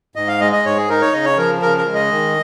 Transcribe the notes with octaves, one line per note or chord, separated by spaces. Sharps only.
G#2 D#5
F5
G#3 D#5
D#5
G#2 C#5
G#4
D#4 A#4
C#5
C#3 D#5
C#5
F3 A#4
C#3 A#4
A#4
G#3
D#5
D#3